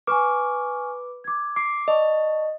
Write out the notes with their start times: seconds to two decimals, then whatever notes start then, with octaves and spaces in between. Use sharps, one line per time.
0.07 B4 G#5 C#6 D6 F6
1.24 D6 G#6
1.56 D6 C7
1.88 D5 D#5 A5 C#6